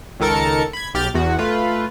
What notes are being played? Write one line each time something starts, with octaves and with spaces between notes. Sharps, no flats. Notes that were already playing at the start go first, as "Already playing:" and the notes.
C#2 D#3 A4 A#4 A6 C#7
B5 G#6
B1 G4 F6 G6 A6
E2 F#4
A3 F4 B4